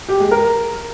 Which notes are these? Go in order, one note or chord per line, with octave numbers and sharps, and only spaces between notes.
G4
G#3
A#4